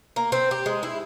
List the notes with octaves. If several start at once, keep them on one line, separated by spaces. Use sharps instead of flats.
A#3
C4
G4
G#3
E4